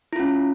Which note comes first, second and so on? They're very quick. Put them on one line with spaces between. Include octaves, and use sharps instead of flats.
E4 F4 C#4